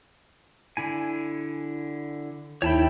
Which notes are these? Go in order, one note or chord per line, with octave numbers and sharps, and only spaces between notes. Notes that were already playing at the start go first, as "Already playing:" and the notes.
D3 E4 G#5
D#2 E4 C#5 G5 A5 B5